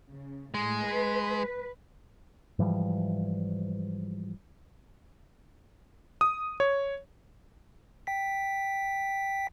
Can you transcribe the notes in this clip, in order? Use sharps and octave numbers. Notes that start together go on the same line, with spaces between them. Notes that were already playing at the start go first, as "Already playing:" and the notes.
C#3
A2 G#3
B4
G#2 E3 F3 G3
D#6
C#5
G5 B6